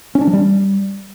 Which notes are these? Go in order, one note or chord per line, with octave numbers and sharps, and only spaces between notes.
C#4
D4
F#3
G3